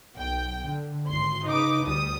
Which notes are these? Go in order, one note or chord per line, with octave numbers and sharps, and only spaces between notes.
B1 G5
D3
G#1 C6 C7
C#3 D#4 B4 D6
D2 G3 D#6